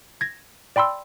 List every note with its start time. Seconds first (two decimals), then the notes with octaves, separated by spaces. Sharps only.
0.21 G#6 A#6
0.76 D5 G5 B5 C6 E6